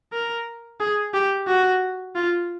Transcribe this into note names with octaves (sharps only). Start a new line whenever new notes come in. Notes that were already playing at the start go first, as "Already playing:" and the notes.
A#4
G#4
G4
F#4
F4